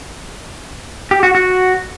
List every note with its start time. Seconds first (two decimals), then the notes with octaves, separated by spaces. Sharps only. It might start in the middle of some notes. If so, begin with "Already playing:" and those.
1.11 G4
1.23 F#4
1.35 F#4